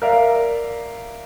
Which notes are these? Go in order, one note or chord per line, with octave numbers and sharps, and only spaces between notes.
A#4 D5 E5 F5